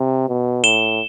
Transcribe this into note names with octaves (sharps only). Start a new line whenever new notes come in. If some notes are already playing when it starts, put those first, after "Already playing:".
Already playing: C3
B2
A2 E7 G7